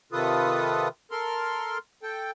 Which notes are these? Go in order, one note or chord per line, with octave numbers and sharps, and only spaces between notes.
C3 D#3 F4 A4 B4 D#6
A4 A#4 C6 F6
A4 G5